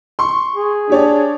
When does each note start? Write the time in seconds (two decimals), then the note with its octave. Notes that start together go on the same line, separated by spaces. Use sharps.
0.19 C6 C#6
0.55 G#4
0.90 D4 G4 C#5 D5